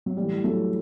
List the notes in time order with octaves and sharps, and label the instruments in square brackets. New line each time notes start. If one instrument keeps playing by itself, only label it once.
[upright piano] F#3
A2 E3 G3
F#3 A3